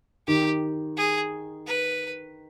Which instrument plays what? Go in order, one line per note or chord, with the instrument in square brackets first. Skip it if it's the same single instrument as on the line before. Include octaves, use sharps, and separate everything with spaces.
[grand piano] D#3 [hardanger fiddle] G4
[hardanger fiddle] G#4
B4